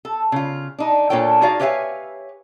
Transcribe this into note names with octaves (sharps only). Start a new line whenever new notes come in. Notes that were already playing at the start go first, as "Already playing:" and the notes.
A4
C#3 F4
D4 D#4
A#2 D4 F4 A4 C#5 G5
D#4 F#4 G#4 D5 F5
G4 B4 C#5 E5 F5 G#5